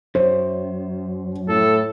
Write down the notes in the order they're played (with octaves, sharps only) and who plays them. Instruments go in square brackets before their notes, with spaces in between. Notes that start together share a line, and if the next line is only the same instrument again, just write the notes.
[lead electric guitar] F#2 [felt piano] C5 C#5
[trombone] A2 [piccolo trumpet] A4